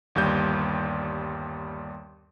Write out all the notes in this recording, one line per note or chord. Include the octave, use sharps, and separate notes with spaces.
G1 D#2 G3 G6